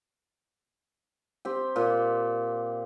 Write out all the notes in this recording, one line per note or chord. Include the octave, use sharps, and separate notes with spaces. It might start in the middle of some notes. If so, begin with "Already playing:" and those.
C4 G4
A#2